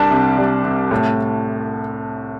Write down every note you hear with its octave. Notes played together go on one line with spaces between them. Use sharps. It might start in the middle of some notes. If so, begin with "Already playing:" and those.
Already playing: C2 G3 D4 A5
C3
G3
C3
A2